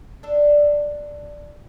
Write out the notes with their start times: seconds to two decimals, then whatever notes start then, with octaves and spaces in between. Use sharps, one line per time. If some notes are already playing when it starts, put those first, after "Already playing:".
0.23 D4 A4